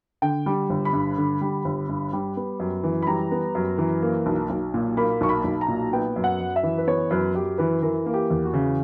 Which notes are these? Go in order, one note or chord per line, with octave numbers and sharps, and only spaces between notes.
D3 G5
G3
G1
B5
G2
D3
G3
G1
G2
G3
B3
F#2
E3
B5
G3 A#5
B3
F#2
E3
A#3
B1
B1
A#2
A#3 B5
B1 C#6
B5
B1
A#5
A#2
B3 G5
F#2
F#5
F#2
E5
E3
B4
B3 C#5
F#2 B4
F#2 G4
E3 B4
E3 A#4
A#3
G4
E2
F#4
C#3